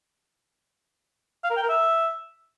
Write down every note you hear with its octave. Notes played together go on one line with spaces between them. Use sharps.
F5
A#4
G5
A#4
E5